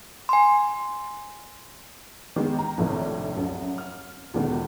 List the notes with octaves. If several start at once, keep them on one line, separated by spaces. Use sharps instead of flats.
G#5 C6
D#3 G#3 B3
A#5
A#1 A2 C3 D#3
C2 F#2
F6
D2 A#2 D3 D#3 G#3 B3